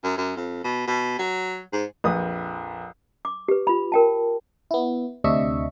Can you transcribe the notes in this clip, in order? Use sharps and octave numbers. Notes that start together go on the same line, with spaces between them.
F#2
F#2
F2
B2
B2
F#3
G#2
A#1 F2 B4 D#6
D6
G4 B4
F4 B5
A#4 G5 A5
B3 E4
D2 C3 D4 D#5 E5 C#6